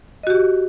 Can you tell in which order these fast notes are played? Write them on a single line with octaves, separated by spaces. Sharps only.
D#5 F#4 G4